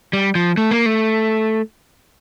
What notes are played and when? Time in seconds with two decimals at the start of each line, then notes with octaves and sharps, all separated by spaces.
0.13 G3
0.35 F3
0.57 A3
0.71 A#3
0.86 A3